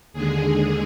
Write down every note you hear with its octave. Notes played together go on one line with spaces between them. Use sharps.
D#2 D3 G#3 G#4